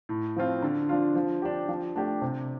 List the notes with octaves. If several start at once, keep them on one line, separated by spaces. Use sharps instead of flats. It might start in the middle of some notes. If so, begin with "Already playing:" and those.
A2
F3 C4 F4
D3
F3 D4 F4
F3
D4 G4
F3
A3 D4 G4
C3